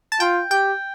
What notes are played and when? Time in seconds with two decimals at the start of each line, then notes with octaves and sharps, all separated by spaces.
0.12 A5
0.20 F4 G5
0.51 G4 G5